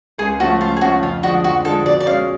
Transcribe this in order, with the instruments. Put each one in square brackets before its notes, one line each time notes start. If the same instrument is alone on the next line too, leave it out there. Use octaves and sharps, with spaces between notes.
[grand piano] C#2 [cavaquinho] G#4
[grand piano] C#3 F3 A3 [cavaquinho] F#4
[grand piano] C#2 [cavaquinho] F4
[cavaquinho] G#4
[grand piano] C#3 F3 A3 [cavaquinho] F#4
[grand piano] F2 [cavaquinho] F4
[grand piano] D3 F3 G#3 [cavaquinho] F#4
[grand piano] F2 [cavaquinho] F#4
[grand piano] D3 F3 G#3 [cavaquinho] A4
[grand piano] B2 [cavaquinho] D5
[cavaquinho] D5
[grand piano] G#3 C#4 [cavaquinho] F5